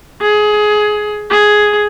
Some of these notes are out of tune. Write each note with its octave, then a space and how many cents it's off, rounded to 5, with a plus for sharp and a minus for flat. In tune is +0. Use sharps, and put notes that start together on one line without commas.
G#4 +20
G#4 +5